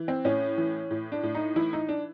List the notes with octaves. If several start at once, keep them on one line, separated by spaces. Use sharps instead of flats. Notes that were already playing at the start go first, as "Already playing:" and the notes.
Already playing: E3
C4
A2 C#4
E3
A2
D4
A2
D#4
E3 E4
D#4
D4